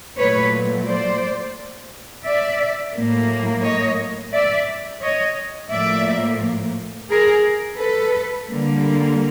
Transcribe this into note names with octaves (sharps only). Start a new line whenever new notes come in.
A#2 F#3 A3 B4 C#5
C5 D5
D5 E5
A2 F#3 A#3
C#5 D#5
D5 E5
C#5 D#5
A2 F3 A#3 D5 E5
G#4 A#4
A4 B4
D3 G3 A#3